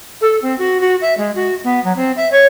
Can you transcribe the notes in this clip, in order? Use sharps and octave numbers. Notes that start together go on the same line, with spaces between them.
A4
C4
F#4
F#4
E5
G#3
F#4
B3
F#3
C4
E5
C#5